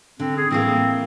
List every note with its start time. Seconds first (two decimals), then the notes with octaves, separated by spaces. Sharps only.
0.20 D3 C4
0.37 G#4
0.51 A2 E3 A#3 C4